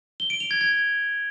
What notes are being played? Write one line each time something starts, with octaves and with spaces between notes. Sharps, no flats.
G7
D7
F7
G#6
G#6